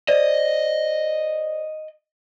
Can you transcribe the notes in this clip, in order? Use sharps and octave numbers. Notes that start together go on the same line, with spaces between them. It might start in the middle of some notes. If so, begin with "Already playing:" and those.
C5 D5 D#5